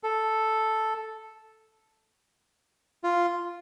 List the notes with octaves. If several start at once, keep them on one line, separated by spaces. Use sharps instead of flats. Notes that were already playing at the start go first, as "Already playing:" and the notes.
A4
F4